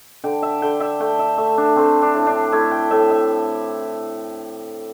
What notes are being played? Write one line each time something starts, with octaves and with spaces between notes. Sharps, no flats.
D3 G5
E5
D3 G5
E5
A3 G5
E5
A3 E5
D4
A3 C4
D4
A2
D4
A3 E4
G5
A2 E5
E5